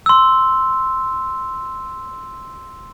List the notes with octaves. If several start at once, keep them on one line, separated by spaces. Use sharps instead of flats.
C6 E6